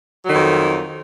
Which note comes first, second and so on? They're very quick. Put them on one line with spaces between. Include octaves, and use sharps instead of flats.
F#3 D#3 F2